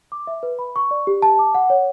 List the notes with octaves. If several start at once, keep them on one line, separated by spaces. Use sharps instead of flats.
D6
E5
B4
B5
C#6
D5
G4
A5
D6
F#5
C#5